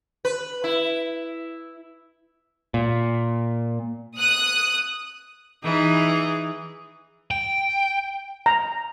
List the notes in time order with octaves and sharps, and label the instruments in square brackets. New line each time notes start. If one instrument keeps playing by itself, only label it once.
[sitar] B4
E4
[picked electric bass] A#2
[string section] D#6 F#6
[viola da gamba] E3 D#4 G#4
[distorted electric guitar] G5
[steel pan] A#5